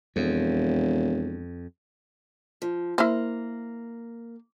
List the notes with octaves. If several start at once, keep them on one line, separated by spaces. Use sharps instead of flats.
E1 F2
F3
A#3 E4 A#4 C5